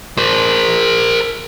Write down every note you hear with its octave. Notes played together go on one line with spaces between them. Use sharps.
A#4 C5